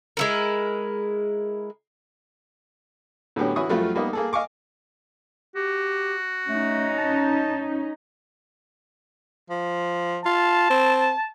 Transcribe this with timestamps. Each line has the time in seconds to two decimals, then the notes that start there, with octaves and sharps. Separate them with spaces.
0.17 G#3 E4 A#4
3.36 A2 D3 F#3 B3 C#4 G4
3.56 E3 C#4 E4 F#4 C#6 D#6
3.69 F#2 F3 G3 A3 F4 F#4
3.95 G3 A#3 B3 D#4
4.13 A#3 G#4 A4
4.33 D#5 F5 G#5 C#6 D6
5.56 F#4 G4
6.49 A3 C#4 D#4
6.98 A5
9.50 F3
10.25 F4 A5
10.70 C4